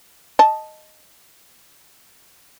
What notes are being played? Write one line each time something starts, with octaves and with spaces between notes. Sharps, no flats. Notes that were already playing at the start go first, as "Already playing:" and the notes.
D#5 A5